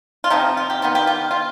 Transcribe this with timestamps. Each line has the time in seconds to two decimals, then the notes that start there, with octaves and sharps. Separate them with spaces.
0.24 F4
0.30 C3 F3 C4 D#4
0.57 F4
0.70 G4
0.82 D#3 B3 F4
0.95 G4
1.07 F4
1.31 F4